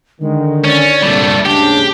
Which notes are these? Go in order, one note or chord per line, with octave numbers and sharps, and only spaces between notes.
D3 D#3 G#3
C#4 D5
C2 A#2 D3 G3 A3
D#2 G#2 C#3 D4 G4